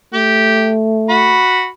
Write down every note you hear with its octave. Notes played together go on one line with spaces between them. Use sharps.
A3 G4
F#4 B5